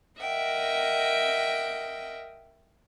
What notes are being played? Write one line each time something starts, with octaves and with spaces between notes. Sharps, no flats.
A#4 D#5 E5 F#5 G5